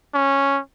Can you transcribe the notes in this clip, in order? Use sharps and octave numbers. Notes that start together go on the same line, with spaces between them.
C#4